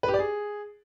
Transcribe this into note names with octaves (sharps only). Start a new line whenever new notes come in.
B4
G4
D5
G#4